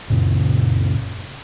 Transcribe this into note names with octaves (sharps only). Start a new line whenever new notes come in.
F#2 A#2 C#3